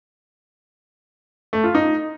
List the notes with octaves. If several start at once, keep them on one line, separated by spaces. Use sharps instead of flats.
A3
F4
D#4